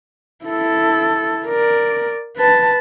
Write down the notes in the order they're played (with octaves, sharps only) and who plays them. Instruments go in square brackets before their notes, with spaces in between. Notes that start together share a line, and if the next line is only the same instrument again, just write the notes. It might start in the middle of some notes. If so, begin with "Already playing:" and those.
[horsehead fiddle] E4 A4
A#4 D5
B4 A5